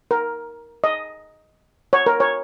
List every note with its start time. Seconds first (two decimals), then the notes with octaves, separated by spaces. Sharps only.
0.11 A#4
0.84 D#5
1.93 C#5
2.06 A#4
2.20 C#5